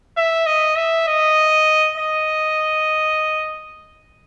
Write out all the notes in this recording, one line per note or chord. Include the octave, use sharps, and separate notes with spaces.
E5
D#5
E5
D#5
D#5